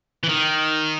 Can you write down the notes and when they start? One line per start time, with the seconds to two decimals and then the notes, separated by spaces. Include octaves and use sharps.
0.23 E3
0.29 D#3